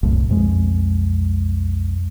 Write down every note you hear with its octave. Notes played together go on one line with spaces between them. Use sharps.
C2 F#2 A2
B1 F2 G#3